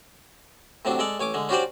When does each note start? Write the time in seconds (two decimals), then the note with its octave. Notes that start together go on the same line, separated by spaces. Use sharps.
0.85 A2 C3 F#3 D4
0.99 G#3 A4 D5
1.20 A1 C#5 G#5 D6
1.34 D3 G#3
1.49 C#4 D4 F#4 G4 C5 D5